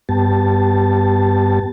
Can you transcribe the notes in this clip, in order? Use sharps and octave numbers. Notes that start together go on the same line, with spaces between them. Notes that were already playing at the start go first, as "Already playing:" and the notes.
G2 B3 G4 A5